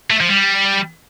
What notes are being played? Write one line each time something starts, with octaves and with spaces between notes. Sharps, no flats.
A3
F3
G3